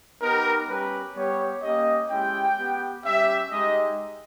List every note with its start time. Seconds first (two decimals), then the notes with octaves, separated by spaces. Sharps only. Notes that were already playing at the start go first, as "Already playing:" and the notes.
0.21 B3 D#4 G4 A#4
0.68 G3 C#4 G4 B4
1.15 G3 B3 G4 C#5
1.62 A#3 C#4 G4 D#5
2.10 G#3 C#4 E4 G4 G5
2.57 B3 G4
3.04 G3 C#4 G4 E5
3.51 G#3 D#4 G4 D#5